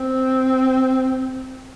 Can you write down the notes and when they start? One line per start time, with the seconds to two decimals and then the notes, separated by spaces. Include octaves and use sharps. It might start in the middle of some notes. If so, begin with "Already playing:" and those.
Already playing: C4